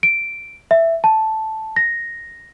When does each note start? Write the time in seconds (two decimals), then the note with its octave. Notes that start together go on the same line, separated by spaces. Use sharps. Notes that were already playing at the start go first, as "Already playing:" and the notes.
0.03 D7
0.71 E5
1.04 A5
1.76 A#6